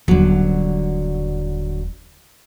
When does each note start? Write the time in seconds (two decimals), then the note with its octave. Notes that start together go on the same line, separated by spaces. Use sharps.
0.08 D#1 D3 F#3